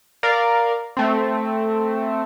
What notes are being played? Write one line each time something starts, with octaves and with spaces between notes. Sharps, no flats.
A#4 D5 F5
A3 C4